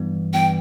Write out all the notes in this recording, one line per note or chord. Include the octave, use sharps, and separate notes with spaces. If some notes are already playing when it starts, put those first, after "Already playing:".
Already playing: G2 E3 G3 B3
E3 G3 B3 G5